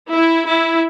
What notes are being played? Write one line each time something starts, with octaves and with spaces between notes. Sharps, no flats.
E4
E4